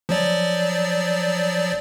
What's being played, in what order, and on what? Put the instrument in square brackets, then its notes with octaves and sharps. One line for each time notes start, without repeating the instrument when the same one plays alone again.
[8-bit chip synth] F3 F#3 D5